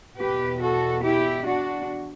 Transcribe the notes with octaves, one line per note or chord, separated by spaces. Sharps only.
E2 B2 G4 B4
F#4 A4
E4 G4
D4 F#4